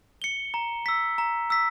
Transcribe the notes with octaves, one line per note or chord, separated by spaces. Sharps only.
C#7 G7
A#5
E6 B6
A#5
E6 B6